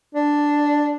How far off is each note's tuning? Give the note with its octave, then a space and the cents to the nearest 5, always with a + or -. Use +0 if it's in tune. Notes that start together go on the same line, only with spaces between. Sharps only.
D4 +0